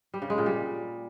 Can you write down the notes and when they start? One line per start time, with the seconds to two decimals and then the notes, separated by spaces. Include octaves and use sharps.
0.14 G3
0.22 C#3
0.30 G#3
0.38 A#2
0.46 G3